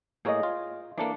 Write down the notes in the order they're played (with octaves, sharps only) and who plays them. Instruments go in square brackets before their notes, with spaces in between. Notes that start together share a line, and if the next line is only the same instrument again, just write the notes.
[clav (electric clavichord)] A2 A#3 C#5 [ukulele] G#4 D#5
[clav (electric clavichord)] F4
[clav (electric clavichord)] E3 A#3 [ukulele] D4 A4